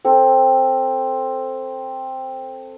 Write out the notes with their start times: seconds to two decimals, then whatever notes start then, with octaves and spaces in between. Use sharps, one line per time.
0.05 C4 A4